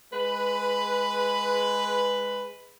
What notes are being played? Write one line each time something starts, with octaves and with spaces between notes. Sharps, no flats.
G#3 B4